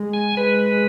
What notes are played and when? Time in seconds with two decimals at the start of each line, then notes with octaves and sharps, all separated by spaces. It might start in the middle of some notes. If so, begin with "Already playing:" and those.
Already playing: G#3
0.14 G#5
0.37 G#3 B4